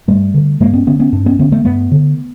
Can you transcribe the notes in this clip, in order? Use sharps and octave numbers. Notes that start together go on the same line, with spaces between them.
G2 G3 A3
D3
G2 G#3 A#3
B3 C#4
D3 B3 C#4
B3 C#4
G2 C4 D4
B3 C#4
D3 B3 C#4
A3 B3
G2 A3 B3
D3